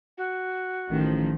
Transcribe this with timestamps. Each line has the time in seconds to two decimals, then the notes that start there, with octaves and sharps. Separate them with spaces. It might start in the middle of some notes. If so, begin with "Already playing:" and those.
0.17 F#4
0.91 A1 D#3 F3